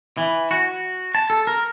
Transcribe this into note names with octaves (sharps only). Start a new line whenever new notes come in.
E3
F#4
A5
A4
A#4